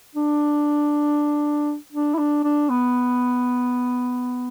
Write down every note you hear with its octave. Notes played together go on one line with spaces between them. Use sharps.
D4
D4
E4
D4
D4
B3